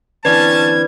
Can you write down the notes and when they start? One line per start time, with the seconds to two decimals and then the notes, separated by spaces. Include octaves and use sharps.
0.25 D3 E3 C4 C#4 B4 D5 A5 G#6